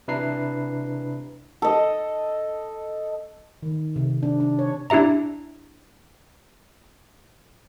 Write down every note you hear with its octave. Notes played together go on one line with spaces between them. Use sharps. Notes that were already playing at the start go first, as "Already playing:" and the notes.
C3 D4 E4 B4 A#5 C7
A4 D#5
D#3
C3
D4
D4
C#5
D4 E4 G4 E5 A#5